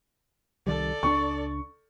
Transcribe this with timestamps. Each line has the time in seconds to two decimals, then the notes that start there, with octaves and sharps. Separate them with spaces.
0.67 C2 D#3 G3 A4 D5
1.03 C#2 C#4 D4 C#6